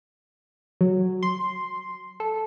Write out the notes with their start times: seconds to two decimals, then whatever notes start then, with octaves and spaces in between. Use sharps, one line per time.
0.81 F#3
1.23 C6
2.20 A4